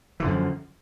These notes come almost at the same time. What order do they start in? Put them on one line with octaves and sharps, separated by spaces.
E3 D3 F#2 F3